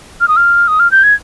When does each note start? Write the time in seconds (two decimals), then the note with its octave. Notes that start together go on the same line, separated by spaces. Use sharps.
0.21 F6
0.28 D#6
0.37 F6
0.68 D#6
0.80 F6
0.92 G6
1.04 G#6